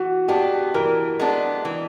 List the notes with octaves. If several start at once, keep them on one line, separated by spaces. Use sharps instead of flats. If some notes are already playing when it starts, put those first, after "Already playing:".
Already playing: E3 F#4
G#3 B3 D4 G4
E3 A#4
G#3 B3 D4
E3